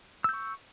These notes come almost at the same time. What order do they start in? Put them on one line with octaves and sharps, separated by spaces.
E6 G6 C#6